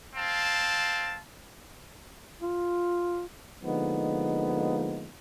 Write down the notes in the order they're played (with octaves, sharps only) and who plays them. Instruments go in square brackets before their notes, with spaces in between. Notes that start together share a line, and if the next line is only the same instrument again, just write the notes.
[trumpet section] C4 F5 A5
[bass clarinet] F4
[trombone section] D3 F3 G#3 A#3 B3 D#4